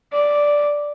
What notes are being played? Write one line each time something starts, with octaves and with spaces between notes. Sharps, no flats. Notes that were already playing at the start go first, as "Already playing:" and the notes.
D5